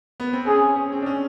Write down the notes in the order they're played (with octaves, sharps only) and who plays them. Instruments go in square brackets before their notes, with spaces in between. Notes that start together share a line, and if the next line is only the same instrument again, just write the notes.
[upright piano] B3
C4
[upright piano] C#4 [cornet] G#4
[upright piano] C#4
C4
D4
C#4